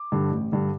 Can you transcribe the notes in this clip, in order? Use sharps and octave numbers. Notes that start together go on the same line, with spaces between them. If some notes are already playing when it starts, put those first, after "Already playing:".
Already playing: D6
G2 D3
A1
G2 D3